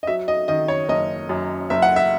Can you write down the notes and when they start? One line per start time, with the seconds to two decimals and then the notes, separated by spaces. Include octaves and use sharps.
0.03 D#5
0.07 F#3 E5
0.28 D#5
0.48 D#3 D#5
0.68 C#5
0.89 F#1 D#5
1.29 F#2
1.70 F#1 E5
1.82 F#5
1.96 E5